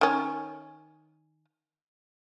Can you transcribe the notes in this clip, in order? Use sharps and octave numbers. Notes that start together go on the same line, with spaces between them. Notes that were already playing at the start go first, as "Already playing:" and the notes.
D#3 C#4